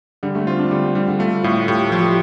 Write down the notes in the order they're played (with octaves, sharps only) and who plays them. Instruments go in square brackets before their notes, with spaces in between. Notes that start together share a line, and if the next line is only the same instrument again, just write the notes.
[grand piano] D3 [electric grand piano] G3
[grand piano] A3
[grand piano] C4 [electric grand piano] F4
[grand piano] D4
[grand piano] D3 [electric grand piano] G3
[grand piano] D3 [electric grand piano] G3
[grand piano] D3
[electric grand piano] A3 [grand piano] F4
[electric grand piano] A2 [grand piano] F4
[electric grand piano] A2 [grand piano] G4
[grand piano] A4
[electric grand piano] F3
[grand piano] G4